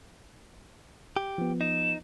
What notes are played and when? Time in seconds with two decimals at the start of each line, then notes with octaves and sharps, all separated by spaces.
1.17 G4
1.38 F3 B3
1.61 D#4 E7